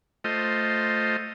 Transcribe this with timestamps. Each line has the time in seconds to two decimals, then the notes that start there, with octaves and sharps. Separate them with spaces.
0.24 A3 F4 C5 D#5